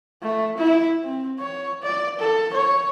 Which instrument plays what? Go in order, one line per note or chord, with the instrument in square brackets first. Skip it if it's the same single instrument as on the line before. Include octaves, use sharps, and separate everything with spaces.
[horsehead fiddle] A3
E4
C4
C#5
D5
A4
C#5